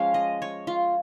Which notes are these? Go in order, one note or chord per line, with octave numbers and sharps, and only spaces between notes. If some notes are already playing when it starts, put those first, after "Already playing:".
Already playing: F3 G#3 C#4 F5
D#5
C#5
F4